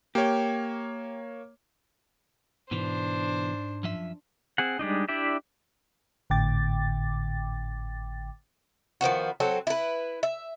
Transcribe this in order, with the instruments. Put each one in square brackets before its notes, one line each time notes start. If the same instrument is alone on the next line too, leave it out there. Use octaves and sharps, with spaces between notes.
[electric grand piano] A#3 C#5 [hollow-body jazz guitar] G4
[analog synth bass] G#2 [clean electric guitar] B2 E3 [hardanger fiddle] D4 C5
[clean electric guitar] F#2 F3 E5
[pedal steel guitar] C4 G#4 F#5
G3 G#3 D4 D#4
D4 E4 G4 D5 E5
[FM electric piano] G#1 A2 D3 G5 D6 A6
[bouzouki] D#3 F3 B3 F#4
F#3 C4 A4
E4 B4
E5